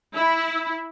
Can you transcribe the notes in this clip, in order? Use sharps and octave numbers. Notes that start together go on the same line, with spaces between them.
E4